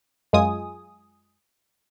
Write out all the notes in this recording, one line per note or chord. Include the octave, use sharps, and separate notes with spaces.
F#2 G#3 F4 G#5 D#6